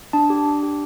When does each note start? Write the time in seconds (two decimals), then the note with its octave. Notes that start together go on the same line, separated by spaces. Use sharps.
0.13 D4 A5
0.30 G4
0.46 D4
0.63 G4